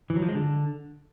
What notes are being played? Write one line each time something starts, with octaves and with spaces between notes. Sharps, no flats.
E3
F#3
F3
G#3
D3